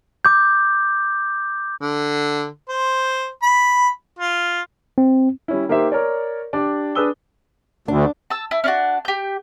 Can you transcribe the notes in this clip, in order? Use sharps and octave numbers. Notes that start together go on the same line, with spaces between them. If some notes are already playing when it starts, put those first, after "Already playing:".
D6 G6
D3
C5
B5
F4
C4
G3 C#4 E4
A#3 D#4 G4 C5 E5
A#4 C#5 D5
D4 G4 D5
D4 G#4 B4 D#6 E6 G7
D2 D4
A5 E6
E4
C#4 D4 F#4
G4 G6